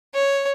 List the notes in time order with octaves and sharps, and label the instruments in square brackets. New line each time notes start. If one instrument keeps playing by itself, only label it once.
[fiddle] C#5